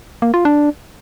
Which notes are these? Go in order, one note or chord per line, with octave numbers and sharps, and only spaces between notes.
A#3
F4
D4